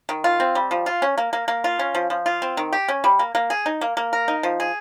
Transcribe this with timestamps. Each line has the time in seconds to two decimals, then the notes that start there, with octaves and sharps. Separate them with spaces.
0.09 D#3
0.24 F4
0.40 C4
0.55 G3
0.71 F3
0.86 F4
1.02 C#4
1.18 A#3
1.33 A#3
1.48 A#3
1.64 F4
1.79 C#4
1.95 F3
2.10 F3
2.26 F4
2.42 C4
2.57 D#3
2.73 G4
2.89 C#4
3.04 G3
3.19 A#3
3.35 A#3
3.50 G#4
3.66 D#4
3.81 A#3
3.97 A#3
4.13 A#4
4.28 D#4
4.43 F3
4.60 G#4